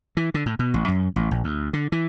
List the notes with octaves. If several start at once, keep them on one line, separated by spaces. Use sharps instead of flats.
E3
D3
A2
B2
A1
F#2
A1
A#1
D2
D3
E3